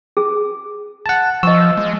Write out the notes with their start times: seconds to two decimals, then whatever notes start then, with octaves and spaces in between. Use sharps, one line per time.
0.17 G#4
1.06 F#5 A5
1.43 F3 D#5 C#6 E6
1.77 G#3